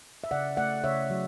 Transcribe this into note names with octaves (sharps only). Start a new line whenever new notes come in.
E5
C#3 D5 F#5
A3 D5 F#5
C#3 C#5 E5
F#3